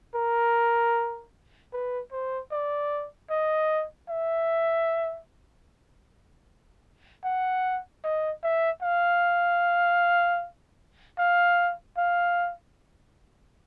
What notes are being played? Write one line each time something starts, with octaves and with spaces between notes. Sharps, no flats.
A#4
B4
C5
D5
D#5
E5
F#5
D#5
E5
F5
F5
F5